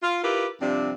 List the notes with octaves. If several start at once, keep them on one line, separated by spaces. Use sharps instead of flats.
F4
E4 F4 G4 A#4 B4
G2 C3 F3 C4 D4